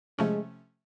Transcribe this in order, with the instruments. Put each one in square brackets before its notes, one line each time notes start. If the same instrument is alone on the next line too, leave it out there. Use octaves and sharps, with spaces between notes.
[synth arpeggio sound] C3 F3 A3 C#4 [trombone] G#3